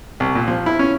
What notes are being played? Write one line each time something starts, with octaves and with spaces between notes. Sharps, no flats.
C2
A#2
F3
E4
C#4